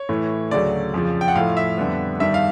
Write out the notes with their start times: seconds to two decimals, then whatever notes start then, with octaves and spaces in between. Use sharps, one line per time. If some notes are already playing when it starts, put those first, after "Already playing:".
Already playing: C#5
0.09 A2 E3 A3
0.51 D2 C#3 F#3 A3 D5
0.94 F2 C#3 F3
1.21 G5
1.28 F#5
1.35 A2 F3 A3 F5
1.57 E5
1.78 F2 D3 G3 B3
2.20 G2 D#3 G3 E5
2.34 F5